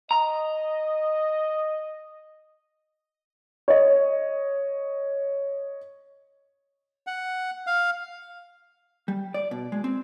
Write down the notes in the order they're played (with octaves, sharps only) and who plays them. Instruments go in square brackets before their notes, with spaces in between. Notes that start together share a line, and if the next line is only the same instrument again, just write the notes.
[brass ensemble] D#5 [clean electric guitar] A#5
[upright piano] C#5 D#5
[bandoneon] F#5
F5
[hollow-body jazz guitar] G3
D5
B2
G#3
C4